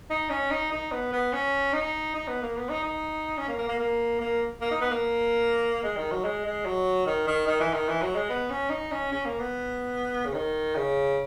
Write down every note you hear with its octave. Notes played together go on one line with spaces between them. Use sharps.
D#4
C#4
D#4
D#4
B3
B3
C#4
D#4
D#4
B3
A#3
B3
D#4
D#4
C#4
A#3
A#3
A#3
A#3
A#3
A#3
D#4
B3
A#3
G#3
D#3
F#3
G#3
G#3
F#3
D#3
D#3
D#3
E3
D#3
E3
F#3
G#3
B3
C#4
D#4
C#4
C#4
A#3
B3
C#3
D#3
C#3